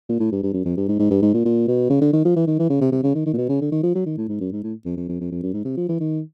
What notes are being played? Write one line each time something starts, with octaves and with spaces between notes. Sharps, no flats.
A#2
A2
G2
G2
F#2
F2
G2
G#2
G#2
G2
G#2
A#2
A#2
B2
C#3
D3
D#3
F3
E3
D#3
E3
C#3
C3
C3
C#3
D#3
D#3
A#2
B2
C#3
D3
D#3
F3
F#3
D#3
A2
G#2
F#2
G#2
A2
F2
F2
F2
F2
F2
F#2
G#2
C3
F3
E3
D#3